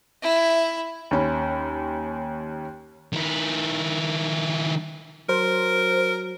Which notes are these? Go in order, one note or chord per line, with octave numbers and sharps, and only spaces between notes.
E4
D#2 C#4 B5
D#3 E4
F#3 A#4 C5